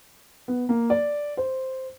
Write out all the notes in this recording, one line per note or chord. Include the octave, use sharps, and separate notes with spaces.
B3
A#3
D5
C5